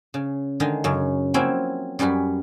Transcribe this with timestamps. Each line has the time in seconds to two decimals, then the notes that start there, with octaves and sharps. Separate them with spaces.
0.14 C#3
0.60 D3 D#3 G#3 D#4
0.84 F#2 C#3
1.34 F3 F#3 A#3 C4 C#4 E4
1.99 F#2 G3 C#4 F#4 B4